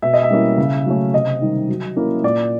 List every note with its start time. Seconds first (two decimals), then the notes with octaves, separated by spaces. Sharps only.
0.02 B2 E5
0.13 D#5
0.23 E5
0.30 G3 A#3 C#4 E4
0.58 C#3
0.86 F#3 A3 C#4
1.14 C3 D#5
1.41 D#3 G3
1.69 F#3
1.96 A#3 C#4 E4
2.23 A#2 D5